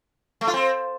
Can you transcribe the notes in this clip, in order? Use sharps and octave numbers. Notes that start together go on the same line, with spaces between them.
A3
F4
C4